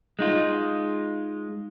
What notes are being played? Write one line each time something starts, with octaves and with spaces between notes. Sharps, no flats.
G#3 D#4 F4